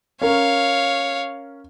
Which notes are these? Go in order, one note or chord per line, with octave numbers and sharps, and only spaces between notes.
C#4 A#4 C#5 F5